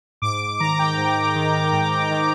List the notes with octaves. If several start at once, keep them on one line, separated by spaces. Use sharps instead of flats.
G#2 D6
D#3 A#5
G5
G#2
D#3
G#2
D#3